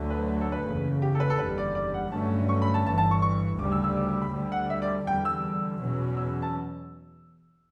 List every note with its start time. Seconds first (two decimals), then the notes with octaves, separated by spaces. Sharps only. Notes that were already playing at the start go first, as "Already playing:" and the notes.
Already playing: D2 D3 F#3 A3
0.10 B4
0.41 A4
0.52 B4
0.66 F#1 E2 C#3
1.02 G4
1.15 A4
1.20 B4
1.30 A4
1.38 F#1 E2 D3 G3 B4
1.58 D5
1.75 D5
1.94 F#5
2.12 G2 D3 F#3 A3 C#4 A5
2.49 C#6
2.62 B5
2.74 A5
2.86 G1 G2 E3 A5
2.98 A5
3.11 C#6
3.22 C#6
3.59 D2 C#3 G3 D6
3.72 E6
3.84 E6
3.97 D6
4.08 D6
4.22 B5
4.33 D2 D3 G3
4.52 F#5
4.70 E5
4.82 D5
5.07 E2 D3 G3 G5
5.25 E6
5.81 E2 B2 F#3 C#4
6.17 E6
6.42 A5